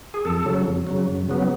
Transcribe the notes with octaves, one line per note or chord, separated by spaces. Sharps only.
G#4
F2 A4
C#3 F#3
F2
C#3 F#3
F#2
C#3 F#3 B3